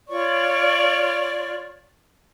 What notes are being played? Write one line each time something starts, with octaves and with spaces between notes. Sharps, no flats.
F4 C#5 D5 C#6